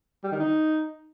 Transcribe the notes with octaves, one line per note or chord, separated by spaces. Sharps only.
G3
D#3
D#4